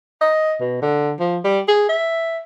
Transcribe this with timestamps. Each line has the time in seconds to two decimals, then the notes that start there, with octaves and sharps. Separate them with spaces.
0.21 D#5
0.60 B2
0.82 D3
1.20 F3
1.45 G3
1.68 G#4
1.89 E5